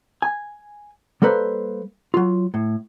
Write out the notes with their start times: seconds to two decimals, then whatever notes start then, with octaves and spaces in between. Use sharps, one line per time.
0.22 G#5
1.22 G3 A#3 A4 B4 C5
2.14 F#3 F4
2.54 A2